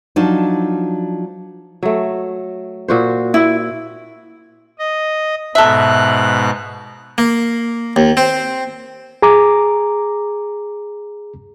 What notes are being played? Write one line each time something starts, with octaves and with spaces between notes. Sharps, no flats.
F3 F#3 D4 D#4
F#3 A3
A#2 F#4 C5
E4
D#5
G#2 B2 A4 E5 F#6
A#3
D#2
C4
G#4 A#5 D6